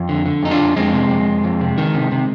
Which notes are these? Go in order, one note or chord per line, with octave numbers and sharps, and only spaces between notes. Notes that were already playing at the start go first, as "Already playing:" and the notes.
Already playing: F2
D3
D3
F2 D#4
D4 F4
F2
F2 G#3 C4
C3
F2
F2
F2
C3
D#3
C3
C3